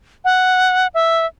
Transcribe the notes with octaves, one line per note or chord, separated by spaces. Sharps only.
F#5
E5